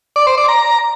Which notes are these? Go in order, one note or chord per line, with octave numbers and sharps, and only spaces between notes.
D5
C5
D5
A#5